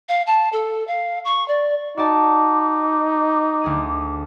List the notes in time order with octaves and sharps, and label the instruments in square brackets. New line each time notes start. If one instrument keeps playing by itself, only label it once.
[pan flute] F5
A5
A4
F5
C#6
D5
[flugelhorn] D#4 [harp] F#4 D5 A5 [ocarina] D6
[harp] D2 G#4 D#7